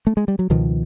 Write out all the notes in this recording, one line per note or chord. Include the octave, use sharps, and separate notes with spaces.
A3
G#3
G3
F#3
C#2 B2 D#3 F3